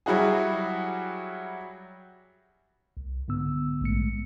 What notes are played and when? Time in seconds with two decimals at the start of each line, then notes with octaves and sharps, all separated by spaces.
0.06 F#3 G3 E4 F#4 G#4
2.97 C2
3.28 G#2 D3 B3 E6
3.81 A#1 G#3 A3 C#7